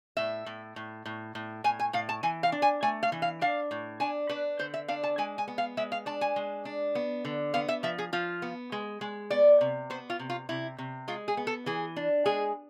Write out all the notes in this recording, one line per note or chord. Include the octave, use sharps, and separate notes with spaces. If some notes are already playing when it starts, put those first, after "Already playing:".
A2 E5
A2
A2
A2
A2
A2 G#5
G#5
A2 F5
A5
E3 G#5
F5
D4
G#5
A3 G#5
F5
E3
F5
D4 F5
A2
D4 G#5
D4 B4
D3 C5
E5
D4 F5
A5
G#3 G#5
G#5
B3
F5
G#3 E5
F5
D4 A5
G#5
G#3
D4
B3
D3
B3 F5
E5
F3 E5
G#4
F3 F4
B3
G#3
G#3
B3 D5
C3
B3 C5
F4
C3
F4
C3 E4
C3
G#3 F4
G#4
B3
A4
E3 G#4
D4
G#3 G#4